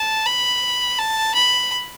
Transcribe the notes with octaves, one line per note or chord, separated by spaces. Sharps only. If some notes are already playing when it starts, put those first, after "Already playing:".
Already playing: A5
B5
A5
B5